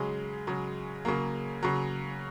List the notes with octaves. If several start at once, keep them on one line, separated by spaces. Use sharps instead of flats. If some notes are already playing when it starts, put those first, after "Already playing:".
Already playing: C#3 F#3 G#3
C#3 F#3
C#3 F#3 A#3
C#3 F#3